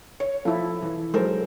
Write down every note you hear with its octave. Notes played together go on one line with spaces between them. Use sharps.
C#5
F3 E4 A4
E3
F#3 G#3 A4 A#4 C5